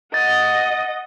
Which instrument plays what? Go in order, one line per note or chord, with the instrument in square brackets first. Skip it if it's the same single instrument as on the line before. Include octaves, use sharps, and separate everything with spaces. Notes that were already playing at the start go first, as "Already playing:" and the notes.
[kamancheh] D#5 F#5 [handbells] A6